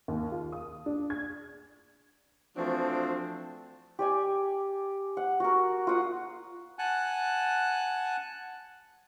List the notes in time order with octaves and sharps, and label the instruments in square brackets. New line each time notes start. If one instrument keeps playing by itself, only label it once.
[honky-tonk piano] D#2
F4
D#6
D4
G#6
[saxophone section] E3 F3 A3 C4 D4 F#4
[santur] G4 D5 G#5
F#5
F#4 A#4
F4 F#5 D#6
[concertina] F#5 G#5 A5 F#6